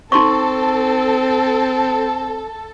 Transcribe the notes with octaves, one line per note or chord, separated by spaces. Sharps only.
C4 D#4 A4 C6 C#6